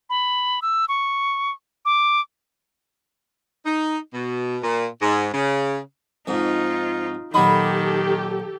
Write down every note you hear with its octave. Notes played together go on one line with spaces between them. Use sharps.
B5
E6
C#6
D6
D#4
B2
A#2
G#2
C#3
F2 G#2 D#4 F4
A#2 D#3 F#3 D#4 G4 A4 B5